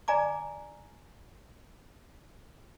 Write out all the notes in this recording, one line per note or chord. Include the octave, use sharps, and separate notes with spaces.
D5 G#5 A#5 D6